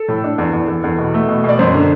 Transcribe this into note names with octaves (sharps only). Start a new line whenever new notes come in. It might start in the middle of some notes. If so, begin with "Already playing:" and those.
Already playing: A4
A2
D4
E2
E2
E2
E2
B2
A3
B2
B2 D5
F#2 C5
D3